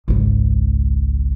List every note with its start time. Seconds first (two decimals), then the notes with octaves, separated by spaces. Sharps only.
0.08 G#1 C#2